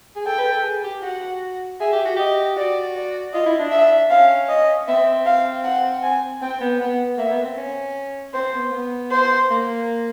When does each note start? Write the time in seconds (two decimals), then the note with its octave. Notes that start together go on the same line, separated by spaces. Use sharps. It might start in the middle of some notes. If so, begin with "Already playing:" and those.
0.16 G#4
0.26 A4 G5
0.38 B4
0.52 A4
0.64 G#4
0.84 G4
1.02 F#4 F#5
1.80 G#4 E5
1.93 G4
2.05 F#4
2.17 G4 D#5
2.56 F#4 D5
2.96 D5
3.33 F4 D#5
3.46 E4
3.59 D4
3.72 E5
4.10 C#4 F5
4.49 D#5
4.88 C4 E5
5.26 F5
5.64 F#5
6.03 G#5
6.42 C4 G5
6.61 B3
6.80 B3 F#5
7.17 A#3 E5
7.31 B3
7.43 C4
7.57 C#4
8.34 C4 C5
8.53 B3
8.72 B3
9.11 C5
9.50 A#3